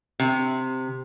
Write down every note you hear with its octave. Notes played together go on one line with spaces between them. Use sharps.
C3